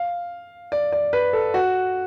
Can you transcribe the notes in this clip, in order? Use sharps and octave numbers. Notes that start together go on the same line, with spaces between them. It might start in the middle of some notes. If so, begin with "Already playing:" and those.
Already playing: F5
D5
D5
B4
A4
F#4